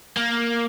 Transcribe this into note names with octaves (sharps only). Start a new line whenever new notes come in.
A#3